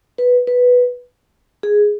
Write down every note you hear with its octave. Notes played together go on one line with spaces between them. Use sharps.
B4
B4
G#4